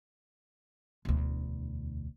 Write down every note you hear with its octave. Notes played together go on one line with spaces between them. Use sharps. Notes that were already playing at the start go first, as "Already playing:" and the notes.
E1 D2